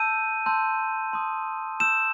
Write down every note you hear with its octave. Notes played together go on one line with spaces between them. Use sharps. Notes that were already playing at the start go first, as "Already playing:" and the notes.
Already playing: A5 E6 G6 D#7
A5 C6 E6 G6
A5 C6 D#6 G6
A5 E6 G6 E7